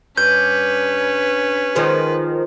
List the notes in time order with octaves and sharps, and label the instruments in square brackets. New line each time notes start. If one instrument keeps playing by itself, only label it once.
[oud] G2 [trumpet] C#4 [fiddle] B4 [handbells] G6
[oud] D#3 F3 G#3